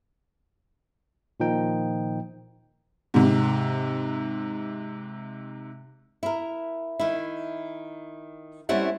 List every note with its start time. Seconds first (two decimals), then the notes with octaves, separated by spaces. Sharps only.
1.40 A#2 D#3 F3 D#4 G5
3.14 G#2 C3
6.23 E4 A#4
7.00 D#3 E4
8.69 G3 A3 C4 C#4 E4 F#5